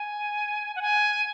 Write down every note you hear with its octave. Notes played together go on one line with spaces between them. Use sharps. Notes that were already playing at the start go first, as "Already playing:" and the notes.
Already playing: G#5
F#5
G#5